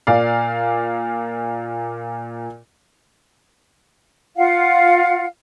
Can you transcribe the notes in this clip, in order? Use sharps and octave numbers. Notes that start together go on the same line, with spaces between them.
A#2 D5 F5
F4 F5 F#5